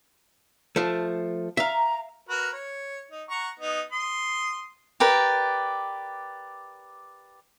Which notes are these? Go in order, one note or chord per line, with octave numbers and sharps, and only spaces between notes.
F3 A3
E5 F5 A#5
F#4 A#4 B4
C#5
D#4
F#5 A#5 C#6
B3 D#4
C6 D#6
G4 A#4 B4 D5